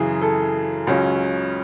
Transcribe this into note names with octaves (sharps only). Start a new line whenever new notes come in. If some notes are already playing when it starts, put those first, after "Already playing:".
Already playing: F#2 C#3 E3 G#4
A4
C#2 C#3 F#3 C#4